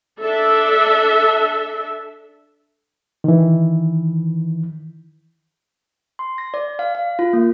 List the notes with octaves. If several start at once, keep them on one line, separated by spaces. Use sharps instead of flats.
D4 A4 E5
D#3 E3
C6
A#6
D5
F5
F5
F4
A#3